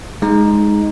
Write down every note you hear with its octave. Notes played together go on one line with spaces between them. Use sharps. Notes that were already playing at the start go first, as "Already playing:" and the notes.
G#3 D#4